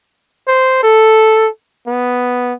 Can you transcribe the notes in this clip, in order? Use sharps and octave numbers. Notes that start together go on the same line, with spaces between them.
C5
A4
B3